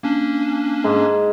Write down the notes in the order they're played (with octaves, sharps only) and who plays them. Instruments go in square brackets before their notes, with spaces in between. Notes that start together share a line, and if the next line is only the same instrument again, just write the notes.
[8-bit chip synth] A#3 C#4 D4
[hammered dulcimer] G#2